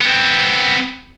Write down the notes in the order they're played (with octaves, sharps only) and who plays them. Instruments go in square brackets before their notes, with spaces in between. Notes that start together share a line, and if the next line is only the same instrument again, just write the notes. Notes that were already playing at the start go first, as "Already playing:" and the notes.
[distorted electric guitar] B3 C4